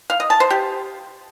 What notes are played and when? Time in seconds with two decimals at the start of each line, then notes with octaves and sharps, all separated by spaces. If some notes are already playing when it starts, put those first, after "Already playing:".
0.10 F5
0.20 D#5
0.30 A5
0.40 C5
0.50 G4